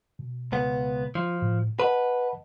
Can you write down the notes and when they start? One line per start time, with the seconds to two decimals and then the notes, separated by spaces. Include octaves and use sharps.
0.19 B2
0.52 C#2 B3
1.15 F3 F4
1.42 A2
1.80 B4 D#5 F#5 A5